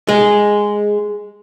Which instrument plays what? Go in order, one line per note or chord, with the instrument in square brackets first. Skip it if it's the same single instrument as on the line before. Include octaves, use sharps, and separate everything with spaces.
[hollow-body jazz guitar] G#3